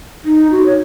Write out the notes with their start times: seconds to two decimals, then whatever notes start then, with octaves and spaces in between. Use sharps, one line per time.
0.25 D#4
0.52 F#4
0.66 C#5